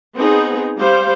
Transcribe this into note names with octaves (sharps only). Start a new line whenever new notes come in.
B3 C4 D#4 G#4
G3 C5 F5